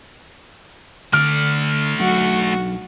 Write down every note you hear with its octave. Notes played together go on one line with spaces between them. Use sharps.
D3 A3 D5 F6
B1 F#3 D4 F#4